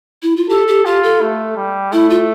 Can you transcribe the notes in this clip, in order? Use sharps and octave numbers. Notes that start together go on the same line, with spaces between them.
E4
F4
G4 A4
G4
F4 G4
A4
A3
G3
A3 E4
F4